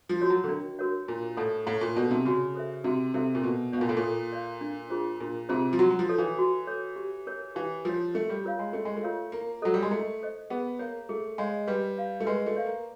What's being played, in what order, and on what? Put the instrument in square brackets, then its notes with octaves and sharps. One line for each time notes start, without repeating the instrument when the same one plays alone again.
[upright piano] F3
[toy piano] F#4 A#4 C#5 F#5
[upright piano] F#3
D3
[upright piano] D#3 [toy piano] D4
[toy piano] F#4 A#4 C#5 F#5
[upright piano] A#2 [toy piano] E4
[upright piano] A2 [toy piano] A4 D5 F#5 A5
[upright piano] A2 [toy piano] E4
[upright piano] A#2
[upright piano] B2 [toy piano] A4 D5 F#5 A5
[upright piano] C3
[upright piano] C#3 [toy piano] F#4
[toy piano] A4 C5 E5
[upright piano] C3 [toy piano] F#4
[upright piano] C3 [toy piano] A4 C5 E5
[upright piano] A#2
[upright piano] B2 [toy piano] A4
[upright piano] B2 [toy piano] D5
[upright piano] A#2 [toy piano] F5
[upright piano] A2
A#2
[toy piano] A4
D5 F5
D4
F4 G#4 C5
[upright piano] A#2 [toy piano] D4
[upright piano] C3 [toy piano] F4 G#4 C5
[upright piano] F3
[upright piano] F#3 [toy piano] F#4
[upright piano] F#3
F3
[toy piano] A4 C#5
[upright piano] E3
[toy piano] F#4
A4 C#5
G4
A#4 C#5
[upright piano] E3 [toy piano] G4
[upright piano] F3 [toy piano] A#4 C#5
[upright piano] A3 [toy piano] C#4
[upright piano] G3
[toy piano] F4 A#4 C#5 F5
[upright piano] G#3
[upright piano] A3 [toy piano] C#4
[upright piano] G#3
A3
[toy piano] F4 A#4 C#5 F5
[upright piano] A#3 [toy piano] E4
[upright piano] F#3 [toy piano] A4 C5 D#5
[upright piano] G3
G#3
[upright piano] A3 [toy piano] E4
[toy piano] A4 C5 D#5
[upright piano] B3 [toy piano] G#4
[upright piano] A#3 [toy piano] C#5 F5
[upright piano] A3 [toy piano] G#4
[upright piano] G#3 [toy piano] C#5 F5
[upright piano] G3 [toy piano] B4
[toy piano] D5 F5
[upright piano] A3
[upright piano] G#3 [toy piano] B4
[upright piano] A3
[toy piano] D5 F5
[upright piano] A#3